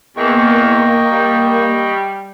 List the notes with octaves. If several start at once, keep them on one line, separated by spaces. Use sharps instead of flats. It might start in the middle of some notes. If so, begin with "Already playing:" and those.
E2 A#3 D#5 G5 C#6
G3